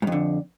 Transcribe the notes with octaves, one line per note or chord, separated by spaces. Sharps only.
F2 G#2 D3